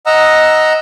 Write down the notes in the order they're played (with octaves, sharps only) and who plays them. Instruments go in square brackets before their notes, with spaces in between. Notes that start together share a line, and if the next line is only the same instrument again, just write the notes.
[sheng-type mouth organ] D#5 F#5 A#5 E6